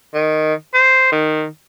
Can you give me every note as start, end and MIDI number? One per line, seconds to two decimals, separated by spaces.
0.14 0.54 51
0.74 1.09 72
1.12 1.45 51